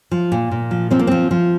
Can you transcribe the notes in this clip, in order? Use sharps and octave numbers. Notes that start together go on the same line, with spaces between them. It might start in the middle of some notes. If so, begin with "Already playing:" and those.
F3
A#2
A#2
F3
F3 C4
A#3
F3 C4
F3